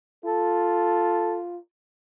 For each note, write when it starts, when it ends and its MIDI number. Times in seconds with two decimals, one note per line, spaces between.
0.25 1.59 65
0.25 1.38 69